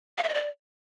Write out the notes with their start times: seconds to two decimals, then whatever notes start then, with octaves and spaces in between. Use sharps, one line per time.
0.18 F5
0.23 E5
0.29 D#5
0.34 D5